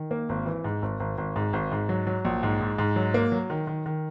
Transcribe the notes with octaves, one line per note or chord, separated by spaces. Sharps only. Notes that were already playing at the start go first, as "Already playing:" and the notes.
Already playing: D#3
A#3
G#1
E3
G#2
G#1
G#1
G#1
G#2
G#1
G#2
F#3
F#3
A#1
G#2
G#2
G#2
F#3
A#3
F#3
D#3
D#3
D#3